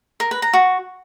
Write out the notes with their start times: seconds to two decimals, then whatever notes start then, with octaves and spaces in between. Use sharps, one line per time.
0.20 A#4
0.31 B4
0.42 A#5
0.53 F#4